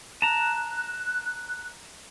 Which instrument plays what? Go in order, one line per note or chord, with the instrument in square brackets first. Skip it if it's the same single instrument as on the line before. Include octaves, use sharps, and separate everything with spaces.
[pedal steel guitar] A5 A#5 [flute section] F#6